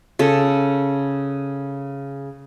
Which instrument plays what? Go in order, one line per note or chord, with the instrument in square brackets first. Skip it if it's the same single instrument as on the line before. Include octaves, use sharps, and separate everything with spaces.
[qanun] C#3 A4